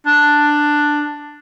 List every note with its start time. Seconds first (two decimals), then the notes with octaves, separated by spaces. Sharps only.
0.06 D4